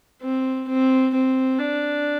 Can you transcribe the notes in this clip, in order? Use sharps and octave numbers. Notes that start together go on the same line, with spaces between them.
C4
C4
C4
D4